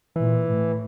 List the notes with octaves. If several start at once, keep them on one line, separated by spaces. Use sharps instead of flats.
A#2 E3
A2